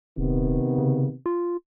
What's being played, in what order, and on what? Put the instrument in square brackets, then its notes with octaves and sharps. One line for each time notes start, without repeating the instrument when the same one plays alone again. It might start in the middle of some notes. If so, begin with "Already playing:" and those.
[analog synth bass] D#1 [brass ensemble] C3 D#3 B3
[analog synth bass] C#3
F4